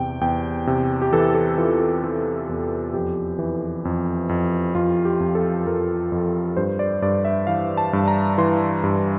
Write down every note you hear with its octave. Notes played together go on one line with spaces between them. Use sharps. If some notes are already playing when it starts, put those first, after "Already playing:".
Already playing: E2 C3 G5
E2 G5
C3
G4
E3 A4
A4
E3 F4
A4
E3
E2
F2 G4
E3
F2
F2
F2 F4
G4
F2
A4
F2 A#4
F2
G2 C5
D5
G2 D5
E5
E3 F5
A5
G2
A#5
E3 C6
G2